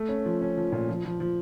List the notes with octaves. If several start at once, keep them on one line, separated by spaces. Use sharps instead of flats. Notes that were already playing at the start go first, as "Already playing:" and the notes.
Already playing: A3
C#4
F3
C#4
F3
A#2
F3
F3
F3